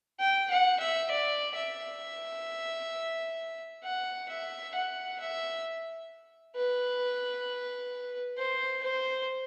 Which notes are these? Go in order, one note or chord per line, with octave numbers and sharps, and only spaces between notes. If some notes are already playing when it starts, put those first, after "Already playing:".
G5
F#5
E5
D5
E5
F#5
E5
F#5
E5
B4
C5
C5